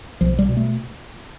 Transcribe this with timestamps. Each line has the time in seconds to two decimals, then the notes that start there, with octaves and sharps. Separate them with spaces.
0.21 B1 F3
0.39 G3
0.49 B2
0.57 A3